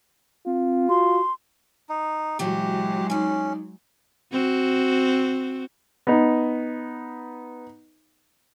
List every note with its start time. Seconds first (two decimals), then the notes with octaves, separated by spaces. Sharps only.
0.46 C4 F4
0.89 F#4 C6
1.89 D#4
2.39 A#2 E3 F#3 G#3 F#4 G4
3.10 C#4 D#4 D5
4.32 C4 F#4
6.07 B3 D#4